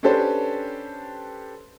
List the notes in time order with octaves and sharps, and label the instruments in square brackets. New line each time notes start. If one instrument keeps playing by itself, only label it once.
[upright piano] C#4 D4 G4 A4 B4 C5